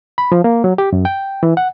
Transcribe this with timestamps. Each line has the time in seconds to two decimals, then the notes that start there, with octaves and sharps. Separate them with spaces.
0.18 B5
0.32 F3
0.44 A#3
0.64 F#3
0.78 G4
0.93 F#2
1.05 G5
1.43 E3
1.57 F#5